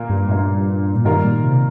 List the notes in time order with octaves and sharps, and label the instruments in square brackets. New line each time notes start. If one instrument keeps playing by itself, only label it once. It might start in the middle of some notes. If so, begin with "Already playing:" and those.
Already playing: [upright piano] A#2 A#3 F4
[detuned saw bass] G2
[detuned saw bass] G2 [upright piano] A#2 A#3 F4
[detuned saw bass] A#2
[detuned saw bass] G2 [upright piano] D#3 G3 A#3 F4 A#4
[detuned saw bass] A#2
C3